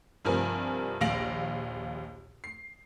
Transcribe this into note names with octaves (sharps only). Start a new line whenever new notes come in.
C2 G2 F3 A#4 G#5
A#1 D#2 F5 A#6 D7 F#7
C7